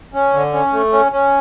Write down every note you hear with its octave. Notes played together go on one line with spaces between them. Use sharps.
C#4
D3
C#4
A3
C#4
C#4